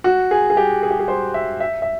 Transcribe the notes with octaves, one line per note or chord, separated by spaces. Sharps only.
F#4
G#4
G#4
G4
G#4
G4
G#4
C5
E5
E5
E5